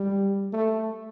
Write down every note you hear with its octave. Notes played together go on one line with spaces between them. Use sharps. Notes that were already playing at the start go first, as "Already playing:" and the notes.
Already playing: G3
A3